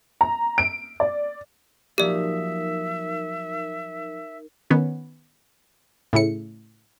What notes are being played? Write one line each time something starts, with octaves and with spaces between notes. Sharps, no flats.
A#5
D7
D5
F3 F#3 A#3 D#4 G4 A#4 D5 E5
D#3 B3 C#4
A2 C#3 E4 C#7